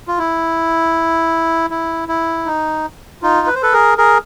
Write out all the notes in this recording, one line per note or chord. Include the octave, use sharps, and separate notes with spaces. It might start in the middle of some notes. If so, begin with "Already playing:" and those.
F4
E4
E4
E4
D#4
D#4 F4
B4
C5
A4 B4
G#4 A#4
G#4 A#4